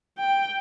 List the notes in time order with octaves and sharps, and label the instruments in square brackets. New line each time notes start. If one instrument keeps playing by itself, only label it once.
[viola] G5